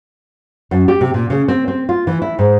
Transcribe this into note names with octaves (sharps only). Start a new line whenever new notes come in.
F#2
G4
C3
A#2
C#3
C4
C4
F4
E3
E4
G#2